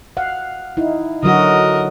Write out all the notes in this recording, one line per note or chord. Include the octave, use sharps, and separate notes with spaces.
F5 F#5
D#4 E4
D3 F#3 F#4 A#4 D#5